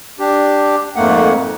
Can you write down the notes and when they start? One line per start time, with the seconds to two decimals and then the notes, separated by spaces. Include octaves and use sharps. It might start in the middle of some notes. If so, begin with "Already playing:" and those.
0.19 D4 G4
0.96 F2 G#2 A3 A#3 F#5